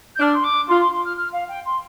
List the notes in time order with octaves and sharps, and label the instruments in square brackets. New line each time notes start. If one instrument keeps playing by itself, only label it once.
[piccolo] G6
[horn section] D4 [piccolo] F6
[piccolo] C6
D6
[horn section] F4 [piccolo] C6
[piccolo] C6
C6
F6
F6
F5
G5
C6